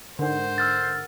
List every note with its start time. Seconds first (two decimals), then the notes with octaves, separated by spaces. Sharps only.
0.19 G#2 D3 A#4 C5 F#5
0.58 E6 F6 A6